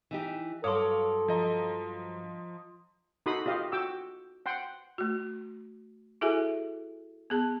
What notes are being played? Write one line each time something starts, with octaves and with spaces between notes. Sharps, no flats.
E3 D#4 G4
G2 F#3 A4 C#5 F5 C6 D6 D#6
F3 D#5 A#5
D#4 F#4 A4 B5 C6 D#6
F4 G4 D#5 F5
F#4 G5 D6 E6
F#5 G5 C6
A3 F#4
E4 F#4 G#4 A4 E5 G#5
B3 G#4 A5